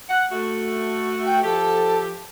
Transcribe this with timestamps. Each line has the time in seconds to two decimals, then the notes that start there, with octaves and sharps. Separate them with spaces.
0.09 F#5
0.32 A3 F#4
1.26 G5
1.43 F3 G4 A4